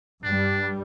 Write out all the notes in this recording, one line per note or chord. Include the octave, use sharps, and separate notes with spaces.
G2 G3 D4